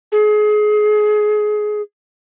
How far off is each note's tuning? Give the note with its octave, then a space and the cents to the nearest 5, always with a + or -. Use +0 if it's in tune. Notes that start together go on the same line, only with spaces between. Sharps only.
G#4 +25